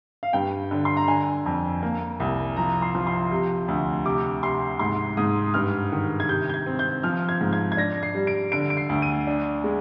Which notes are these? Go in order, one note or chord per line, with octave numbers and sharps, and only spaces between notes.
F5
G2 G5
D3
C6
A#5
D3 G#5
F2
A#3
C2
F3 A#5
C6
F3
C6
C3
D2
C3 D6
C3 C6
G#2 C6
G#2 D#6
G2 F6
D#3
G#6
C3 G6
G6
G#6
C4
G6
F3 F6
G#6
G#2
G#6
G#6
D4 A#6
C7
G3
D7
D3 D7
D7
C7
D2
D#7
D4
G#3